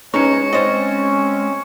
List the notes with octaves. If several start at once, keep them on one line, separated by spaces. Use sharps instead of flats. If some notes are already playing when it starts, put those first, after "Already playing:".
G#3 C#4 D#4 B4 C#5 A#5 C#6 C#7
C4 C#4 C5 D#5